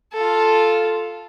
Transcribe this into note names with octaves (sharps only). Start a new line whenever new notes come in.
F4 A4